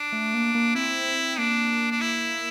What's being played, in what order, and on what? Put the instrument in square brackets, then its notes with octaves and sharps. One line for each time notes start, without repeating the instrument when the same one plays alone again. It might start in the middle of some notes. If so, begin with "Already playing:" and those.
Already playing: [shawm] D4
[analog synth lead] A3
A#3
A#3
[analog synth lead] C4 [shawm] E4
[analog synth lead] A#3 [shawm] D4
[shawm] D4
E4